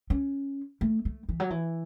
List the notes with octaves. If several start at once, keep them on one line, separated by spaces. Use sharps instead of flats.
C#4
A3
A3
E3
F#3
E3